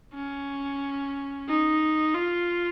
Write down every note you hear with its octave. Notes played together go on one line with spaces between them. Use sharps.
C#4
D#4
F4